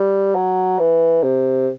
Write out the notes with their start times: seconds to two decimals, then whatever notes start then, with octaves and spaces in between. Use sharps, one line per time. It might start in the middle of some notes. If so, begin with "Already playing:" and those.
Already playing: G3
0.35 F#3
0.79 E3
1.23 C3